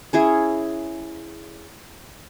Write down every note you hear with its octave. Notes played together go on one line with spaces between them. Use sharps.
C#4 E4 G#4